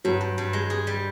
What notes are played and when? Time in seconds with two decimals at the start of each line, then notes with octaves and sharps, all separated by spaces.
0.05 G2 F#3
0.21 G2
0.38 G2
0.53 G#3
0.70 G#4
0.87 G3